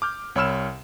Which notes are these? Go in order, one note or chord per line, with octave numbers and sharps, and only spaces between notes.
D6 F6 G6
C2 C#5 B5 E6 F6 E7